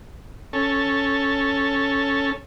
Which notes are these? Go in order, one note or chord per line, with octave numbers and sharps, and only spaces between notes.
C#4 A4